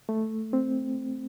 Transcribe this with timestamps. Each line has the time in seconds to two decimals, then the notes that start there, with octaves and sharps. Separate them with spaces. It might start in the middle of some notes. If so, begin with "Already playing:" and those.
0.09 A3
0.53 C4